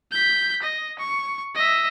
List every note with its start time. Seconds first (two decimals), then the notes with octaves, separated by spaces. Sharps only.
0.12 G6 B6
0.62 D#5
0.98 C#6
1.55 D#5 E5